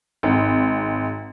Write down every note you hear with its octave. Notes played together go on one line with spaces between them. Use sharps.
G#1